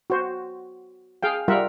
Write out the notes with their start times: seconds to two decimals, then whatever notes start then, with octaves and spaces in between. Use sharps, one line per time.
0.10 F#4 C5
1.23 G#4 F5 G5
1.48 G3 F4 A#4 E5 F#5